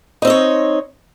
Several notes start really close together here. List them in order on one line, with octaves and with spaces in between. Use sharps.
D#4 C4 D#5 C#5